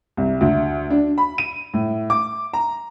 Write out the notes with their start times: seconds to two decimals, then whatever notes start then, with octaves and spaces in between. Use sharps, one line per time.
0.17 C2
0.41 D2
0.90 D4
1.18 B5
1.38 D#7
1.74 A2
2.10 D6
2.53 A#5